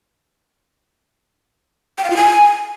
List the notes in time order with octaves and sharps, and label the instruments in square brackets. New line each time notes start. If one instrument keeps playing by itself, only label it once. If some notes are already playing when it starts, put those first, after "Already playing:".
[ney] G5
F5
F4
G#5